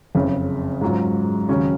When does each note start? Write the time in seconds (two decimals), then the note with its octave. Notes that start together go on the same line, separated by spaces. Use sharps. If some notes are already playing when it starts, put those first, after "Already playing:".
0.15 F#1 F2 C#3
0.81 G#2 F#3 C#4 F4
1.48 D#2 C#3 F#3 C#4